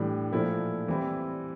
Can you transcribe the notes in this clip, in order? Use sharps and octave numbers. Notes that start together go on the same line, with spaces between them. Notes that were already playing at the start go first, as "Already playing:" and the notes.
Already playing: A2 E3 G3 D4
A#2 F3 A3 E4
E3 G3 C4 E4